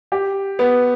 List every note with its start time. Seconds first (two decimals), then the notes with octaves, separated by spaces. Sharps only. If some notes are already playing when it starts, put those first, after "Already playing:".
0.12 G4
0.59 B3